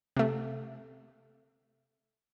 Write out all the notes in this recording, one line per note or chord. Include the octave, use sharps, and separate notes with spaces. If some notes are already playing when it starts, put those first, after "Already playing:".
C3 A3